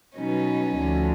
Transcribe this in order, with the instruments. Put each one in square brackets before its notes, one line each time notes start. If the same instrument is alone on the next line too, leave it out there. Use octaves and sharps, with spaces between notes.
[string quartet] B2 F#3 B3 D#4 [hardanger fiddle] C#4
[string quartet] D2 D3 F3